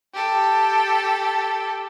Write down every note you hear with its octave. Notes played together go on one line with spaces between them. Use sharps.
G4 A4